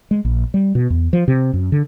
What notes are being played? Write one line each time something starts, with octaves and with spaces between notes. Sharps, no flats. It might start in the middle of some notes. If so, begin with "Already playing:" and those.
G#3
A#1
G3
B2
E2
F3
C3
F#2
D3